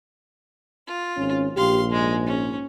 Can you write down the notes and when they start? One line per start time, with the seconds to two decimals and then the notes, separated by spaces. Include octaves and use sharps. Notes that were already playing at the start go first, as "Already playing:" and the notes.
0.87 F4
1.17 G#1 C#4
1.57 A#1 G4 F5 C6
1.91 G#2 G#3
2.26 C#4